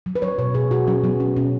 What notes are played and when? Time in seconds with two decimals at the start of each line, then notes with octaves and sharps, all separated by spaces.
0.06 F#3
0.15 B4
0.22 F#3 C#5
0.39 B2 C#5
0.55 B2 G#4
0.71 B2 F#4
0.87 F#3 C#4
1.04 F#3 B3
1.20 B2 C#4
1.36 B2 C#4